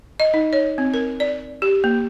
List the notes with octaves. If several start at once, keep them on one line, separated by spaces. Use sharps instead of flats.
D#5
D#4
C#5
C4
A#4
D5
G4
A#3